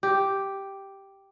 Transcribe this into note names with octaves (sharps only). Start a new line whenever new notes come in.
G4